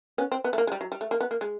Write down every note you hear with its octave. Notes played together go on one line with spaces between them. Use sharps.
B3 C#4
C4
B3
A3
A#3
G#3
G3
F#3
G3
A3
A#3
B3
A#3
G#3